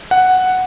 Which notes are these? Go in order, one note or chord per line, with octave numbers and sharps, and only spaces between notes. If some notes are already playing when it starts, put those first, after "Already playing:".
F#5